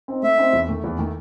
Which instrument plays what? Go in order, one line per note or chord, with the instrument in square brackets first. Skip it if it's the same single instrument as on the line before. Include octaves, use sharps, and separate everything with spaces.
[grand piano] C4 D#4
[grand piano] A3 [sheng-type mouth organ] E5
[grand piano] C4 D#4
E2
D#3 A3
E2
D#3 A3